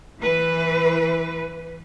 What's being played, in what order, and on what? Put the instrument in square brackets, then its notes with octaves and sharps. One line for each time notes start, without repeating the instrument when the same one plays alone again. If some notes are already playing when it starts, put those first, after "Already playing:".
[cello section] E3 B4